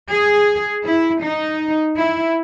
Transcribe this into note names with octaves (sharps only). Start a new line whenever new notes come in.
G#4
E4
D#4
E4